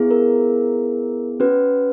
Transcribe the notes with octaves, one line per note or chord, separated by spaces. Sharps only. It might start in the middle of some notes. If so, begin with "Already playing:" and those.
Already playing: B3 E4 G#4
A#4
C#4 F#4 B4